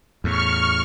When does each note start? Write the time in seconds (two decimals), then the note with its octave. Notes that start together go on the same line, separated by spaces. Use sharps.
0.24 E2 A2 C#6 F6